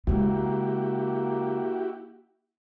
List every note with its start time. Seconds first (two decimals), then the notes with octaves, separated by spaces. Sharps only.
0.07 C#3 G#3 A#3 E4 F#4 G4